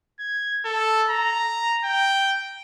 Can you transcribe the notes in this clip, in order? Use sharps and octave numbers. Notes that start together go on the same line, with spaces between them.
G#6
A4
A#5
G5